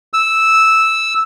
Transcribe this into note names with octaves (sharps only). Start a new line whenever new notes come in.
E6